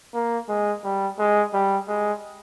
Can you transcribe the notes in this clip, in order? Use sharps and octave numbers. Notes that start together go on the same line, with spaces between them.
A#3
G#3
G3
G#3
G3
G#3